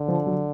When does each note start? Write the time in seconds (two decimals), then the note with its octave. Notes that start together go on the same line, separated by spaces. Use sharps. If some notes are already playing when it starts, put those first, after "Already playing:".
Already playing: D3
0.08 F3
0.27 F#3